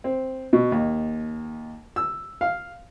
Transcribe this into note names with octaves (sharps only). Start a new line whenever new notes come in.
C4
B2
D#2
E6
F5